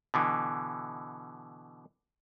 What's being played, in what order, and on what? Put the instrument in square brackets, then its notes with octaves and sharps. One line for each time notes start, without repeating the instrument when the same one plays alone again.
[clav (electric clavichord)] B2 D3 E3